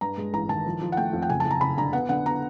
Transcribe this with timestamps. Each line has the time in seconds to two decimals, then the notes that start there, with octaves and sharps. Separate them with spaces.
0.01 G2 A#5
0.18 G#3
0.33 A1 A#5
0.49 D#3 A5
0.66 F3
0.81 F3
0.92 F#5
0.97 A3 G5
1.13 F2
1.22 G5
1.29 F#1 G#5
1.40 A5
1.45 F#1
1.51 A#5
1.61 F#1 B5
1.77 D3 A#5
1.93 B3 F#5
2.09 D3 F#5
2.26 B3 A#5